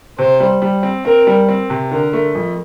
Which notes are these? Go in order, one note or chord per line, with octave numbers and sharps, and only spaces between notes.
C3 C5
G3
G3
C4
C4 A#4
G3
C4
C3
D3 A#4
A3
F2